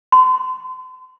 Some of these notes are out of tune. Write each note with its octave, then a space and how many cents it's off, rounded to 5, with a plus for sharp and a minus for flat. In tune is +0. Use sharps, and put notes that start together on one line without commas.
C6 -35